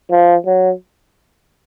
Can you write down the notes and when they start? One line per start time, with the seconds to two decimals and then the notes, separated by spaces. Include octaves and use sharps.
0.11 F3
0.46 F#3